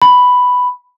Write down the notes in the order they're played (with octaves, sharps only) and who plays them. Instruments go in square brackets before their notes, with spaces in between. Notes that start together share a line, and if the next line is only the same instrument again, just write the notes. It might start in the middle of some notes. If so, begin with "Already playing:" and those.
[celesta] B5